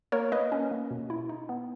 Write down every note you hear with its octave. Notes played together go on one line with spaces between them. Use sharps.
A#3 A#4 C#5
A#3 B4 D#5
C#4
A#3
B2
E4
D#4
B3